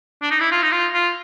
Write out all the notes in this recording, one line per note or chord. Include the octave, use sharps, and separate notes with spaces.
D4
D#4
E4
F4
D#4
F4
F4